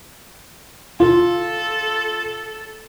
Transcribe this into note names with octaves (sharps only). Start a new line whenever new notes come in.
F4 A4